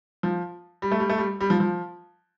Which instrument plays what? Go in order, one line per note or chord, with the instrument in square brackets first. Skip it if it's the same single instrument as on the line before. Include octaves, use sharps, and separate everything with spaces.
[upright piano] F3
G3
A3
G3
A3
G3
G3
F3
F3